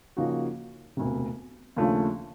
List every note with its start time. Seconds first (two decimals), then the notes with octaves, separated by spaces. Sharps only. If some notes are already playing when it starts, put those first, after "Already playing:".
0.17 C#3 F3 A#3 D#4 F#4
0.97 E1 D2 C3
1.76 D#2 C#3 F3 A3 D4